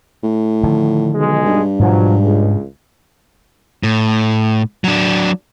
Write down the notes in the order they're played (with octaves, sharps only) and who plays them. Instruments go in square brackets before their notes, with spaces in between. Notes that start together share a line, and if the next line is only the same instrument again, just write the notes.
[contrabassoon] A2
[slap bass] D3 D#3 F3
[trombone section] B1 G#3
[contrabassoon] G2
[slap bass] G#2 B2 G#3 [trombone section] F3 F#3
[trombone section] C#2
[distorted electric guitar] A2
F#3 D4